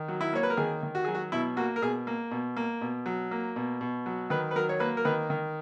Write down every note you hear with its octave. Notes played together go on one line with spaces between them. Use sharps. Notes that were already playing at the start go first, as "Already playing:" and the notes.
Already playing: D#3
F#3
E4
A#3 C#5
B4
A#4
D#3 G#4
D#3
F#4
F#3 G#4
F#4
B2 E4
A#3 F#4
A#4
B2 G#4
A#3
B2
A#3
B2
F#3
A#3
B2
B2
F#3
D#3 B4
B4
F#3 A#4
C#5
A#3 B4
A#4
D#3 B4
D#3